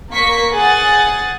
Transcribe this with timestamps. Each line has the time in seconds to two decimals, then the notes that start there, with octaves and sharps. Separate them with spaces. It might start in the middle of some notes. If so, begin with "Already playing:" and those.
0.12 A#3 C#6 B6
0.52 G#4 F#5 G#5 A6